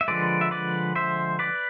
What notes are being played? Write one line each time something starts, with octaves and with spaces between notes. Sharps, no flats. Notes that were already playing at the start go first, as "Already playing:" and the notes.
E5
D3 F3 G#3 B4 D5
E5
B4 D5
C5 E5
B4 D5